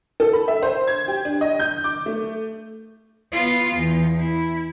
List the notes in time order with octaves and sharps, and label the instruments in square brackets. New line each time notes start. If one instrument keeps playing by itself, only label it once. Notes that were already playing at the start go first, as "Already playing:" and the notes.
[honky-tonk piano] A4
B5
E5
C5
G#6
G4
D4
D#5
G6
D6
A3
[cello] B3 F4
E2
E4